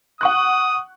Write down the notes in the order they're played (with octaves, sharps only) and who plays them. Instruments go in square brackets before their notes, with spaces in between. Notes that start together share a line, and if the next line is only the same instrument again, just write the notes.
[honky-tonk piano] F#5 C#6 F#6 [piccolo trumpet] D#6